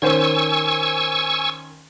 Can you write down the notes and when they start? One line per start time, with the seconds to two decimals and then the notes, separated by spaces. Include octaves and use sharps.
0.02 D#3 C#4 C5 G#5 C#6 E6